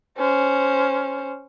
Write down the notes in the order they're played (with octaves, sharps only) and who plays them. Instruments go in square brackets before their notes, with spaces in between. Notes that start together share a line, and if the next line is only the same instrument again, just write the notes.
[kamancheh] C#4 C5